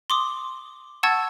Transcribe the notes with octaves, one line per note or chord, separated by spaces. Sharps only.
C6 D6 D#6
F#5 A5 C#6 E6 G#6 A6